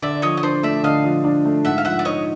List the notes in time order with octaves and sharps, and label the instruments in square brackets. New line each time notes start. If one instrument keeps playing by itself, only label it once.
[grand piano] D3 [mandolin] D5 E5
[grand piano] F3 [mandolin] C#5 D#5
[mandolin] D#5
[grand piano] D4 [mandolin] C5 D5
[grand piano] A3 [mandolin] D5 E5
[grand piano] D3 [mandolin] D#5 F5
[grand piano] F3
D4
A3
[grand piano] G#2 [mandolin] E5 F#5
[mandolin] F5
[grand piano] F3 [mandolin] E5 F#5
[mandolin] D5
[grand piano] D#4 [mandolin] C#5 D#5